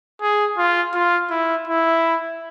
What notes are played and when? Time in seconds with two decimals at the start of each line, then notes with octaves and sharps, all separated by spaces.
0.21 G#4
0.58 F4
0.94 F4
1.30 E4
1.68 E4